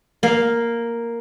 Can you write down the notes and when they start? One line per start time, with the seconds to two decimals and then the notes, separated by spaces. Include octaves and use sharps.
0.23 A#3 F5